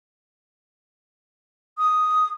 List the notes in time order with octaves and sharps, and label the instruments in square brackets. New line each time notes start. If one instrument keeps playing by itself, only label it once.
[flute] D#6